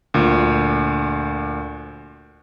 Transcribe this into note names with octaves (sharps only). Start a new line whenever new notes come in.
D2 A#2